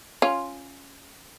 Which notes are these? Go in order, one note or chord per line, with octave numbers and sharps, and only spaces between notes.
C#4 F4